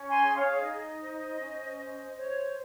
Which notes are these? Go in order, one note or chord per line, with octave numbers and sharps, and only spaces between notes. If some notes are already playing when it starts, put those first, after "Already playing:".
Already playing: C#4
G#5 C6
G#4
C#5 F5
C#5
D#4 D#5
C5
C#4
C5
C5 C#5